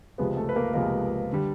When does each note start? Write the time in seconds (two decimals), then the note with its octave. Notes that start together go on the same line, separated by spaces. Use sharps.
0.18 C#2 C3 F3 G#3 B3 B4
0.37 A3 A4
0.49 B4
0.56 A#3 A#4
0.74 C#2 C3 F3 G#3 A#3 B3 A#4
1.33 D3 G3